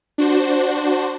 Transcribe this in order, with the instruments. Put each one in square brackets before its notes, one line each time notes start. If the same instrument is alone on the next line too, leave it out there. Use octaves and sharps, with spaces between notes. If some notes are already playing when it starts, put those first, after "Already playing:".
[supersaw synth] D4 F#4 C5